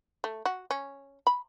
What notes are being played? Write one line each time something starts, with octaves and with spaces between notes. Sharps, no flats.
A3
F#4
C#4
B5